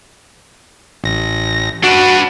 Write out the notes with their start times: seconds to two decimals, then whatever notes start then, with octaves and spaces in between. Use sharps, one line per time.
1.04 A1 A#6
1.84 D4 F#4 B4